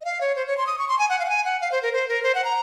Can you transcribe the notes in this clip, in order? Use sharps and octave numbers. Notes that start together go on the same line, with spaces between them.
D#5
F5
C#5
C5
C#5
C6
D#6
C#6
C6
G#5
F#5
F5
F#5
G#5
F#5
F5
C5
A#4
C5
A#4
C5
F#5
A#5